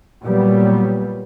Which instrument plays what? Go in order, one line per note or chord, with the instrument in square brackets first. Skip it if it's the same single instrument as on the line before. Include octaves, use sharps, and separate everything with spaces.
[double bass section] A#2 F#3 G3 B3